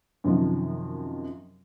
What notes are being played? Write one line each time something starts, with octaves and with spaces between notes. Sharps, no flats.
F#2 C3 D#3 F3